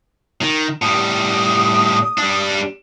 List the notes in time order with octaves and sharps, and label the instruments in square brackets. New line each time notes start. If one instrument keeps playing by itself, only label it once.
[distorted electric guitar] D#3
[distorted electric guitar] A2 G3 [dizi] D#6
[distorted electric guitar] G3 D4